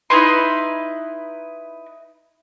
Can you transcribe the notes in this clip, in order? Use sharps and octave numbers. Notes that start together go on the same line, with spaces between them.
D#4 E4 B4 C6